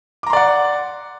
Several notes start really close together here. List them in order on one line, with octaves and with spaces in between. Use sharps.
D6 A#5 C6 D5 F#5